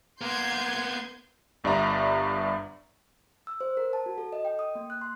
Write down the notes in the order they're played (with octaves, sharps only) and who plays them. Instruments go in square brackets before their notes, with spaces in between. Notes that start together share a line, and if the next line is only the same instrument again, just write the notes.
[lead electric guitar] A#3 B3 [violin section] C6 G6 G#6
[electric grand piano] G1 G2 D5 E5 A#5
[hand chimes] E6
C5
A#4
A5
F#4
A4
D#5
G5
D#6
A#3
F#6
C6